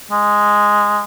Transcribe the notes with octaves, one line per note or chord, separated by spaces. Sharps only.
G#3